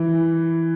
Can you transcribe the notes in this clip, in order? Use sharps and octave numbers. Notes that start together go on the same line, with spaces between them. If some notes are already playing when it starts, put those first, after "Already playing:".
Already playing: E3